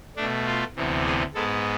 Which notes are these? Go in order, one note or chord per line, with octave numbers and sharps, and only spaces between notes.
B2 A3 D4
F4
D2 C3 E3 B3
G#4
G#2 G#3 B3 A4